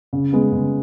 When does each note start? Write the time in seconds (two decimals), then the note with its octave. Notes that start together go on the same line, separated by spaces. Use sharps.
0.13 C#3
0.33 G#3 B3
0.52 C#3